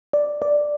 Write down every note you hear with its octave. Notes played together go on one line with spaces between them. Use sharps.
D5
D5